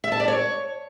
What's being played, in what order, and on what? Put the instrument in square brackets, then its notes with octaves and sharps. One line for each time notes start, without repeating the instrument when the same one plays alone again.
[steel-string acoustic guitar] E5
A5
D5
C#5